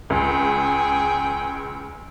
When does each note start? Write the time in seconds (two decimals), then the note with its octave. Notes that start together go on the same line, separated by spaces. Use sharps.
0.10 C#2 G#4 G5